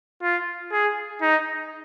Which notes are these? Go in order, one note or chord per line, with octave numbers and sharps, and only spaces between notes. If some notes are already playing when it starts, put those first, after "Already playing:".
F4
G#4
D#4